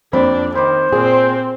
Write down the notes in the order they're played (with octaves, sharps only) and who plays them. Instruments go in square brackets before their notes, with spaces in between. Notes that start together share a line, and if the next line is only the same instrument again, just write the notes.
[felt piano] F2 C5 B5 [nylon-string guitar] A#3 C4 [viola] D4
[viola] D#3 [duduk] C5 [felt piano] B5 D6
[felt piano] A#2 [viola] C4 [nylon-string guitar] G#4